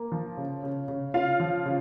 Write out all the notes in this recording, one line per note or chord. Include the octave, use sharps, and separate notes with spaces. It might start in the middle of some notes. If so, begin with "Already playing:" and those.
Already playing: A#3
F3
C#3
C#3
C#3
C#3 F4 F5
F3
C#3